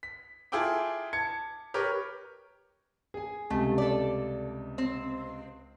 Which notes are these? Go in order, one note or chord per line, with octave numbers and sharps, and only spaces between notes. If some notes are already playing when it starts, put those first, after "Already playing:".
B6
E4 F4 G#4 A4 G5 D6
A5 G#6 C#7
G4 A#4 B4 C#5
G#4 G#5
C#2 C3 G3 A3
A4 D5
C4